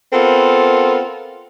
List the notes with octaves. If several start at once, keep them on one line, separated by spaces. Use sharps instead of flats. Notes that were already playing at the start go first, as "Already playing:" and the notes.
B3 C4 F4 A4 A#4